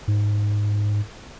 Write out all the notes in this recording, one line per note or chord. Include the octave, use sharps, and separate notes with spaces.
G#2